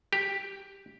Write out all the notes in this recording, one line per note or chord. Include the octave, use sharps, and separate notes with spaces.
G4